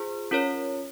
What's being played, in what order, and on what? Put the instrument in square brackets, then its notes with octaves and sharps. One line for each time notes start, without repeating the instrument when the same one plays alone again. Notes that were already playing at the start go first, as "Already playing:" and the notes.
Already playing: [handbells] F4 G#4 C5
C#4 F4 A#4 C#5